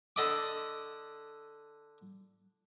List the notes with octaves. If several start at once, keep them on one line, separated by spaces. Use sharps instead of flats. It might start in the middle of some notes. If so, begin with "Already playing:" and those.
D3 A4 D#5 B5 D6